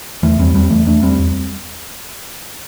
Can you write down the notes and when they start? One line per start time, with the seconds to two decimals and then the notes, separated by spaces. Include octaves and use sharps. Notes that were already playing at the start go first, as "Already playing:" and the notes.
0.23 E2 E3 A3
0.39 E2 G3 C4
0.54 E2 G3 C4
0.70 E2 E3 A3
0.86 E2 A3 D4
1.03 E2 G3 C4
1.19 E2